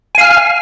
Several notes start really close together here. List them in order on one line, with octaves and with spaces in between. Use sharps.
G#5 F5 F6